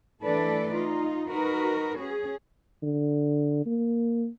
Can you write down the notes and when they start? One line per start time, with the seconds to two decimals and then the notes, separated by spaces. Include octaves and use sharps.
0.22 E3 A3 D4 A4 B4 D5
0.72 D#4 F4
1.29 D#4 F#4 A#4 B4
1.96 C#4 G#4
2.83 D3
3.66 A#3